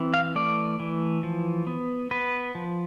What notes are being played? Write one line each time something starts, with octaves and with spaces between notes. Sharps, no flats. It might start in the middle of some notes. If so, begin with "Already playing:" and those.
Already playing: E3 C4
F5
A3 D5
E3
F3
B3
B3 B4
F3